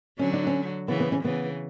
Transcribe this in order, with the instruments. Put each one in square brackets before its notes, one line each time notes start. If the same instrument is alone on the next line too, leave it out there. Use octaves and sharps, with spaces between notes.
[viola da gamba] D3 F#3 [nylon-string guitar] C#4
[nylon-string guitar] D4
C#4
[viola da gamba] C#3 E3 [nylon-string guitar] B3
[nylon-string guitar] B3
C#4
[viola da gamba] C#3 E3 [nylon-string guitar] B3